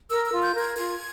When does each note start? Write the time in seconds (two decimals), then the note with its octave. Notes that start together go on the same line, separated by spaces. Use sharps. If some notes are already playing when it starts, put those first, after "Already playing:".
0.09 A#4 E6
0.26 E6
0.31 F4
0.42 G6
0.54 A#4 G#6
0.76 F4 G#6